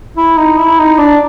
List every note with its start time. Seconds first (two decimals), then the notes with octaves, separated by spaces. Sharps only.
0.17 E4
0.37 D#4
0.58 E4
0.79 D#4
0.99 D4